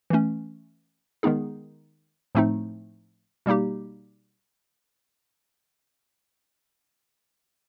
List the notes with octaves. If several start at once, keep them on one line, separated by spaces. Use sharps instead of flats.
E3 A3 C#4
D#3 G#3 B3 D#4 G#4
A2 F3 A3 C4 D#4
B2 G3 A#3 D#4 G4